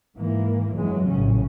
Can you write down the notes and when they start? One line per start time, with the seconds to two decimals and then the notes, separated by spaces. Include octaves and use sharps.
0.17 G#2 E3 A#3
0.74 G1 F2 E3 F#3 G#3
1.09 A#1 A2 C#3 C#4